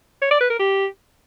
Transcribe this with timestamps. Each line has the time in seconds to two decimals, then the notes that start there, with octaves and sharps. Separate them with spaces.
0.22 C#5
0.31 D5
0.41 B4
0.50 A#4
0.60 G4